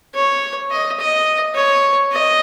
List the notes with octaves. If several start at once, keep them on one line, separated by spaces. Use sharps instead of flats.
C#5
D#5
D#5
C#5
D#5